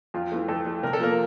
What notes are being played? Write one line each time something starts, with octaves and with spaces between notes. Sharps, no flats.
F2 F4
E3 A3
F2 A4
E3 A3
C3 A#4
A4
F3 A#3 A#4